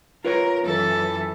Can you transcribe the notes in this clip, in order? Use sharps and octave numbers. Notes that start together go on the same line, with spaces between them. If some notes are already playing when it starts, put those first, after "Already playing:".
F4 A#4 B4 C#5
F#2 E3 A4 A5